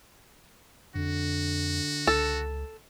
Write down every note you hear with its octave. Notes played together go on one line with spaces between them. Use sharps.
F2 D3 F#4
C#2 A4